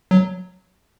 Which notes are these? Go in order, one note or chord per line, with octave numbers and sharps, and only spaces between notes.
F#3